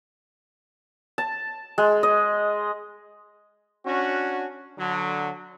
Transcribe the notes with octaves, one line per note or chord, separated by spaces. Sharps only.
A5
G#3
D#5
C#4 D4 F#4
D3 F#3